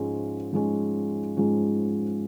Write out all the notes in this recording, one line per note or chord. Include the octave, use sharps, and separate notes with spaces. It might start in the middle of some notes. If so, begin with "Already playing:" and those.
Already playing: G#2 F3 G#3 C#4
G#2 F3 G#3 C#4
G#2 F3 G#3 C#4